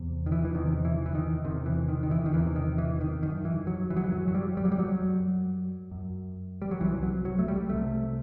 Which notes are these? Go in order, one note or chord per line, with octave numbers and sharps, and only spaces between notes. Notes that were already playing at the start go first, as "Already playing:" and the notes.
Already playing: E2 C3
D#3
E3
E3
E2 C3 D#3
E3
E3
D#3
E2 C3 D#3
E3
D#3
D#3
E3
D#3
E2 C3 E3
D#3
E3
D#3
F#2 D#3
E3
F#3
E3
F#3
E3
F#2 F#3
F#3
G3
G3
F#3
G3
F#3
F#2
F#2
G3
F#3
C2 C3 E3
F#3
F#3
A3
G3
C2 C3 A3